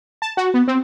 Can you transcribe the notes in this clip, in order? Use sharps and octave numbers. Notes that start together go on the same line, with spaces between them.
A5
F#4
B3
C4